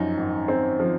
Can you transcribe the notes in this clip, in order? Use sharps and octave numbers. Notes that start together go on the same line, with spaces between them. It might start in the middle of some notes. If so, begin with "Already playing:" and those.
Already playing: F#2 F3 D#4 F#4
G#1
C4
F3